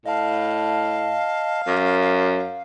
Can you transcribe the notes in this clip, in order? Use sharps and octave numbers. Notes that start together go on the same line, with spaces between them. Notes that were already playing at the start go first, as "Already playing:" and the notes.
A2 D#5 F5 A5
F#2